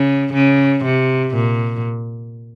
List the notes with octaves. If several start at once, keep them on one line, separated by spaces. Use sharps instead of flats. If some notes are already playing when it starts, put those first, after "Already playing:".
Already playing: C#3
C#3
C3
A#2